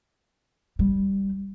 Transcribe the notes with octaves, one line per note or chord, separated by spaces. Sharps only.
G3